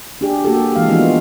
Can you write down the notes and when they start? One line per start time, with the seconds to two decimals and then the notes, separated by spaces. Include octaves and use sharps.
0.21 D4 G4 G#4
0.45 A#3 F#4 G4 A4
0.76 E3 G#3 F5
0.89 F3 G#3 B3 D4 F4 F#4